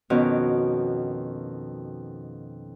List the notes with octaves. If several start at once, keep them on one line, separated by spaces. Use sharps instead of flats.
F2 B2 D#3 C#4 F#4 D6